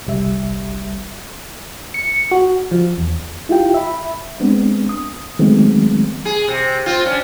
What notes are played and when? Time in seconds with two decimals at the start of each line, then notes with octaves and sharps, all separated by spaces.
0.07 G1 C2 G3 E5
1.94 C#7
2.31 F#4
2.71 F3
2.98 E2
3.49 E4 F4 G4 G5
3.74 E5 B5
4.40 G#3 B3 C4 D4
4.89 D#6
5.39 D#3 F#3 G#3 A3 B3 C4
6.25 G#4
6.48 C3
6.86 C4 F4
7.06 C#4 D4